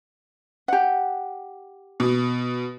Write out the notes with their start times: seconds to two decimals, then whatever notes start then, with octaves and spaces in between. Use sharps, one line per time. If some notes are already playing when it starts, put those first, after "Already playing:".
0.68 G4 F#5
2.00 B2